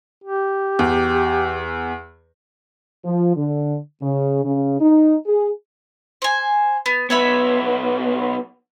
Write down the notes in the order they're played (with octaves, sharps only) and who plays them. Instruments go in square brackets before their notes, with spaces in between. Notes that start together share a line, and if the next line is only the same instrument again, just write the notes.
[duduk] G4
[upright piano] E2
[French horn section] F3
D3
C#3
C#3
D#4
G#4
[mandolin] C5 G#5
B3
[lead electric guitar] B1 B3 [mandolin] C#5 E5 B5